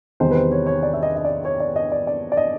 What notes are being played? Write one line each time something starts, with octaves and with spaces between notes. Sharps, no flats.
E2 C3 D#3 G3 C5
B4
C5
C#5
C#5
D5
E5
D#5
D#5
D5
C#5
D5
D#5
D5
D5
D5
D#5